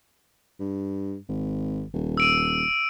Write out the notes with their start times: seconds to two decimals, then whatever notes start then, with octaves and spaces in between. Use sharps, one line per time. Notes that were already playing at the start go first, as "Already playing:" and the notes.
0.60 G2
1.29 G#1
1.94 D#1
2.17 E6 D7 D#7